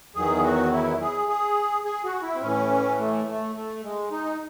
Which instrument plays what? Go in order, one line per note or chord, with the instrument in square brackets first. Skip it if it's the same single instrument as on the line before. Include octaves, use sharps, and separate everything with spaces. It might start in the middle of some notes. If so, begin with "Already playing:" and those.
[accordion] E2 D#3 F#3 G#4
F#4
E4
G#4
G#4
G#4
F#4
E4
C4
A2 E3 C#4
A3
A3
A3
G#3
D#4